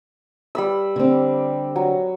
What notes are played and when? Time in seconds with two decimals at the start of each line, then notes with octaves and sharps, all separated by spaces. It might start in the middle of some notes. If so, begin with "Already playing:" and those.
0.55 G3 B5 E6
0.96 D3 C4
1.76 F#3